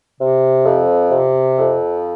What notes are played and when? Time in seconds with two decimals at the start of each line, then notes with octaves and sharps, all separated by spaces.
0.19 C3
0.65 F2
1.10 C3
1.57 F2